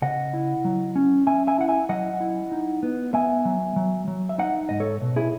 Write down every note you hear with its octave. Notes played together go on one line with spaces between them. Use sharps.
C#3 D#5 F#5
E4
F#3
C#4
C#4 E5 G#5
E5 G#5
E4 F#5
E5 G#5
F#3 D#5 F#5
E4
D#4
B3
B3 E5 G#5
F#3
F#3
F#3
E5
D#4 D#5 F#5
G#2 D#5
A4 C#5
B2
E4 G#4